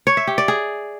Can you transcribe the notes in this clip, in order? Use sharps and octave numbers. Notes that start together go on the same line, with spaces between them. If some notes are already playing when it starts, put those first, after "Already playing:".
C#5
E5
G4
D5
G#4